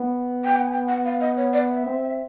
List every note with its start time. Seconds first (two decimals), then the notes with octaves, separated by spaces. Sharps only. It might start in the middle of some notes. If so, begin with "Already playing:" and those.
Already playing: B3
0.44 G5
0.56 F#5
0.66 G#5
0.72 G5
0.88 F#5
1.05 F5
1.21 D#5
1.37 C#5
1.53 D5
1.69 E5
1.86 C4